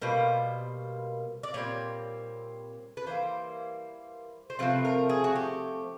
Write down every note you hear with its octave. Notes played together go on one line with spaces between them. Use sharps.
B2 G3 A#3 C5
D5
A#2 G3 C4 C#5
B4
E3 G3 A#3 C5
C5
C3 F3 A3 C4 B4
A#4
G#4
F#4
G4